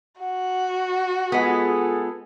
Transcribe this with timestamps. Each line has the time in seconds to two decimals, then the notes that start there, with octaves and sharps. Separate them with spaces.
0.19 F#4 F#5
1.32 G#3 B3 F4 G#4 A4